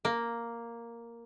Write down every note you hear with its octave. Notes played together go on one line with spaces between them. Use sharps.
A#3